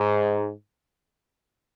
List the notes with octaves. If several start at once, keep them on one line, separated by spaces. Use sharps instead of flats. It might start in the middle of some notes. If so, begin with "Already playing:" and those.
Already playing: G#2